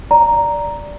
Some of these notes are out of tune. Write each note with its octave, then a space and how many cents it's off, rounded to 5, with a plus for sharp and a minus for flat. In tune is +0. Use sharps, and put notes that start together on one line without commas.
D5 -5 A#5 +0